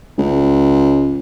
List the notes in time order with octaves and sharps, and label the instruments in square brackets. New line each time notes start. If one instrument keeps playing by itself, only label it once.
[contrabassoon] C#2